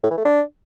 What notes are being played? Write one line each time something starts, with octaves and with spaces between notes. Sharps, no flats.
A2
E3
A3
D4